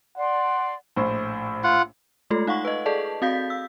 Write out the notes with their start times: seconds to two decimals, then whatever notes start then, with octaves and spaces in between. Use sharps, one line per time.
0.17 D5 F#5 C6
0.96 A#1 A2 C5
1.64 F4 F#5
2.30 G#3 A3 F4 A4
2.47 D#4 F5 F#5 C#6
2.65 B4 D#5
2.86 G#4 A4 D5 D#5 A5
3.22 C4 F#4 F5 G6 B6
3.50 E6